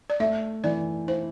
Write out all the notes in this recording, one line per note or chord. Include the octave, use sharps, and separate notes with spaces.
D5
A3 E5
E3 D5
E4 C5